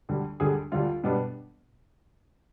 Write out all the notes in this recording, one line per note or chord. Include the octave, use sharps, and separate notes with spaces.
D2 D3 G3
D2 D3 G3 G#4
D2 D3 G3 F4
B2 G3 B3 D4